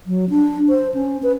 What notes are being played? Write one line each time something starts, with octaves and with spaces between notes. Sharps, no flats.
F#3
D4
C5
C#4
B4